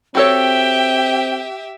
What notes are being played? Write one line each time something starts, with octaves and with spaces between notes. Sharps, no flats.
C4 F#4 G4 A4 C#5 E5 G5